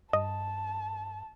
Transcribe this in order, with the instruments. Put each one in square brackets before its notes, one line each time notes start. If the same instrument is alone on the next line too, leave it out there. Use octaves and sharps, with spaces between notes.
[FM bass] G2 [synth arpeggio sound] D#5 [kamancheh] A5